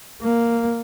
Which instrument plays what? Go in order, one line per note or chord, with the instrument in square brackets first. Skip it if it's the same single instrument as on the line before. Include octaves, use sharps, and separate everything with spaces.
[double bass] A#3